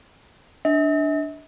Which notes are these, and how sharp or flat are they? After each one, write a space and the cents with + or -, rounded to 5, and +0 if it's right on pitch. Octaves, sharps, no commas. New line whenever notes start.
D4 +0 E5 -45